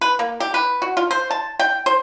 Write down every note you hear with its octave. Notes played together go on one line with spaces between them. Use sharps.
B4
A#3
G4
B4
F#4
F4
C5
A5
G5
C5